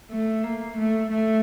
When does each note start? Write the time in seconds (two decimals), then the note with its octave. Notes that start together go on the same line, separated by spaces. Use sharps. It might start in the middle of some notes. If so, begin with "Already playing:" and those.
0.11 A3
0.44 A#3
0.77 A3
1.10 A3